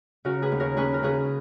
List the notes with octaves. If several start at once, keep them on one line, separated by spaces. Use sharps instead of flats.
C#3 F#4 A#4
G#4 B4
D#2
A#4 C#5
C#4 G#4 B4
A#4
C#3 G#4 B4